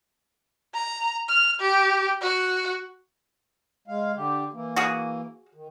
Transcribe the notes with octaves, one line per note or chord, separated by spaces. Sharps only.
A#5
F6
G4
F#4
G#3 F5
D3 G4
E3 A#3
F#4 G#4
D#3